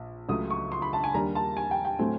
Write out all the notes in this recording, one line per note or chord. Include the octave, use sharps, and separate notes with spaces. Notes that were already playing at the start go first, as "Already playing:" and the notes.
Already playing: A#1
C#2 C#3 F#3 A3 D#6
C#6
C6
B5
A5
G#5
D#2 D#3 G3 A#3 D4 A#5
A5
G#5
G5
G5
A2 F#3 A3 C4 G#5